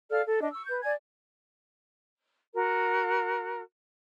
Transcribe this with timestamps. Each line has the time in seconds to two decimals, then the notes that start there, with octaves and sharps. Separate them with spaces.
0.11 A4 D5 F5 F6
0.25 A4
0.40 D4 D#5
0.52 C#6 E6
0.67 B4 G6
0.82 D5 G#5 G#6
2.54 F#4 A#4